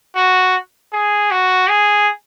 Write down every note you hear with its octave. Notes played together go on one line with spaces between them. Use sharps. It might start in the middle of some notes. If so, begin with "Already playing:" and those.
F#4
G#4
F#4
G#4